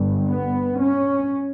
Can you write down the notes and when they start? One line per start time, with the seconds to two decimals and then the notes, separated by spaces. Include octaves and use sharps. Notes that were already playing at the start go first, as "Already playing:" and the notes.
Already playing: G1 G2
0.29 B3
0.80 C#4